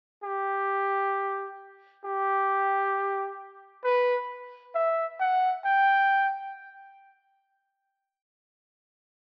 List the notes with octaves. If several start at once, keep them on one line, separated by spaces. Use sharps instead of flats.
G4
G4
B4
E5
F#5
G5